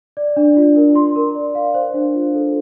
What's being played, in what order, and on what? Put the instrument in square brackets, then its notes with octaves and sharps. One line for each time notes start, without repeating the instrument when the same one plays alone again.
[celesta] D5
D4
F4
A#4
C6
A#4
D5
F5
C5
D4
F4
A4